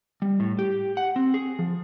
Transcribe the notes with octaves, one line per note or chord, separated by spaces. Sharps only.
G3
A2
G4
F#5
C4
G#4
F3